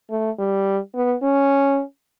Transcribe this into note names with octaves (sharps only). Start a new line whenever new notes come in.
A3
G3
B3
C#4